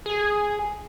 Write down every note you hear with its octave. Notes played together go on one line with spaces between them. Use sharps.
G#4